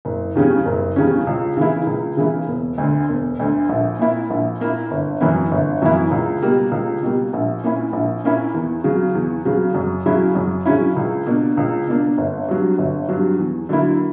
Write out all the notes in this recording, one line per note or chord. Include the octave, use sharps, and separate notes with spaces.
F#1
E2 C#3 G3 C#4
F#1
E2 C#3 G3 C#4
C#2
C#3 E3 A#3 E4
C#2
C#3 E3 A#3 E4
E1
D2
D3
E1
D2 D3
A#1
A#2 A#3 E4
A#1
A#2 A#3 E4
G1
F#2 E3 A#3 E4
G1
F#2 E3 A#3 E4
C#2
B2 G3 A#3
C#2
B2 G3 A#3
A#1
A#2 A#3 C#4 E4
A#1
A#2 A#3 C#4 E4
E2
C#3 F#3
E2
C#3 F#3
F#2
C#3 F#3 C#4 E4
F#2
C#3 F#3 C#4 E4
C#2
B2 A#3 D4
C#2
B2 A#3 D4
G1
G2 F#3
G1
G2 F#3
E2
D3 F#3 A#3 E4